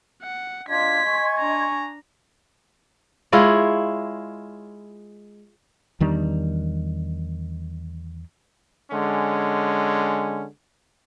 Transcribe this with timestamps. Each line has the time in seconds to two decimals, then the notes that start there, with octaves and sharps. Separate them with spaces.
0.23 F#5
0.69 D4 F4 D#5 C6 G#6 B6
1.05 G#5 C#6
1.39 D4 A#5
3.32 G#3 E4 F4 C#5
6.00 E2 D#3 G3 D4
8.91 D3 G#3 C#4